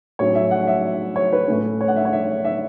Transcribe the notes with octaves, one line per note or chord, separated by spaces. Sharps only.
A2 F#3 C#4 C#5
E5
F#5
E5
C#5
B4
A2 A3 C#4
C#5
F#5
E5
C#5
E5
E5